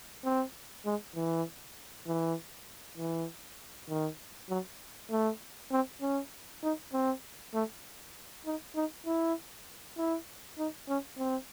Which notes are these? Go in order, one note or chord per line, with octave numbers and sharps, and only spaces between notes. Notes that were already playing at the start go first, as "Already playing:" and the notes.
C4
G#3
E3
E3
E3
D#3
F#3
A3
C4
C#4
D#4
C4
A3
D#4
D#4
E4
E4
D#4
C#4
C4